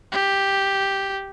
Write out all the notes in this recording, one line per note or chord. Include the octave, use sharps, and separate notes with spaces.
G4